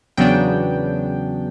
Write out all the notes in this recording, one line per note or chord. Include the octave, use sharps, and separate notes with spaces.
E2 C#3 F#3 B3 D4 G5